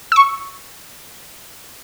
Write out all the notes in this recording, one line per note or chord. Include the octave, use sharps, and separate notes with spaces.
C#6 E6